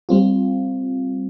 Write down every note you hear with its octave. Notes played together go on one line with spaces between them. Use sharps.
G3 C4 F4